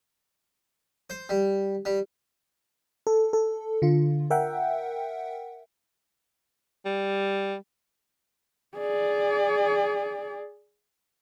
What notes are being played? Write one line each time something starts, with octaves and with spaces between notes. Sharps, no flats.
C5
G3
G3
A4
A4
D3 F4
A#4 E5 F#5 G5
G3
G#4 D5